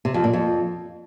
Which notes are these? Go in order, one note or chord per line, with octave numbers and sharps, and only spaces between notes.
C3
F2
A#2
F2